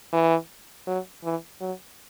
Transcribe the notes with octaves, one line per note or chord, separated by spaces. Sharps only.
E3
F#3
E3
F#3